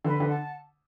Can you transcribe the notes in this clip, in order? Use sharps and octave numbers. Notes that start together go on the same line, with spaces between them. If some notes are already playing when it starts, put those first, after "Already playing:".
D3 B4
D3
F#5 A5